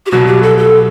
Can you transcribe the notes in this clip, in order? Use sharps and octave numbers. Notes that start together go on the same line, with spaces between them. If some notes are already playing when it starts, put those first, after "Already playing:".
G4
C2 B2 F#3 F#4
G4
A4
A4